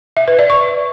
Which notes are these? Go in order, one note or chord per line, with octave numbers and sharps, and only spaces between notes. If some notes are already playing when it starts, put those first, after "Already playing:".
E5
B4
D5
C#6